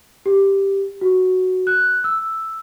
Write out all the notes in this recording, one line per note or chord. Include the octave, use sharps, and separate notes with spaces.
G4
F#4
F#6
E6